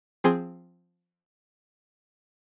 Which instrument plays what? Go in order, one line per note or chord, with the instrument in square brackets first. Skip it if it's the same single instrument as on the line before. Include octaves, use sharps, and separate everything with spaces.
[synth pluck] F3 C4 G#4 C6